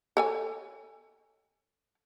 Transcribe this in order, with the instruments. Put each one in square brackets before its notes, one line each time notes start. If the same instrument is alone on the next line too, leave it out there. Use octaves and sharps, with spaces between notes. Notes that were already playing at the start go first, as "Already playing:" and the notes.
[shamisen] A4 C#5 G#5